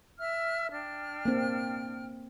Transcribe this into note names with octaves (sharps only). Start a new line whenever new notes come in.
E5 E6 F6
D4 G5 F6
A#3 C4